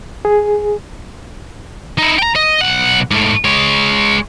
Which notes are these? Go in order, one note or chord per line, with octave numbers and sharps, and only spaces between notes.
G#4
D#4 E4
G5 A#5
D#5
B1 F#5
G#2 A3
G#3 C#5